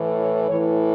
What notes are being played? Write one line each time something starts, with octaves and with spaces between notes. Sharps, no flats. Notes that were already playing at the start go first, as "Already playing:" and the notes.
Already playing: A2 E3
C#5
A2 E3 C#5